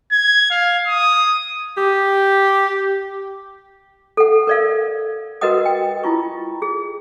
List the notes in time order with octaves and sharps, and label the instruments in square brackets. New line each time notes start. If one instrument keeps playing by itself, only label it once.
[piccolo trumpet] G#6
F5
D#6
[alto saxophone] G4
[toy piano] A4 F#5
A#4 D5 F5
F#4 A#4 B4 D#5 F#5 D#6
G5
E4 F4 C#6
G#4